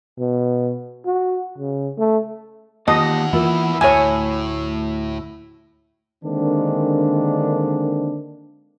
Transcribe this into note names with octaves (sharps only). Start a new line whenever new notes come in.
B2
F#4
C#3
A3
E2 D#3 A#3 F4 G4 D#5 F#5 A5
E3 A#3 E4 F4
D2 A2 C#5 E5 G#5 A5
D3 D#3 G#3 A#3 C4 D4